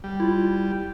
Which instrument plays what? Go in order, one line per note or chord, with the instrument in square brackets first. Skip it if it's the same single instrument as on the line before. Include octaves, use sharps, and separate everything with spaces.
[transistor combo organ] G3
[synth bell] E4 F4